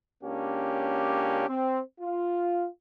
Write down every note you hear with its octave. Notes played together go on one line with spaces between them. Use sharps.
C#2 A#3 C#4 D4 G4
C4
F4